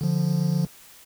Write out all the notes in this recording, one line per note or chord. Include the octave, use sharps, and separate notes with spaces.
D3 F3